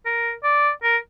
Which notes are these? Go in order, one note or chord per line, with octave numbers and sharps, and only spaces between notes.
A#4
D5
A#4